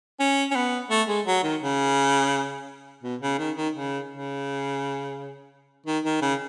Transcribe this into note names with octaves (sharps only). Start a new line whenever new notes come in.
C#4
C#4
B3
A3
G#3
F#3
D#3
C#3
B2
C#3
D#3
D#3
C#3
C#3
D#3
D#3
C#3